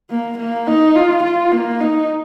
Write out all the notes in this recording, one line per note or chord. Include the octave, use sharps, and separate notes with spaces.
A#3
A#3
D#4
F4
F4
A#3
D#4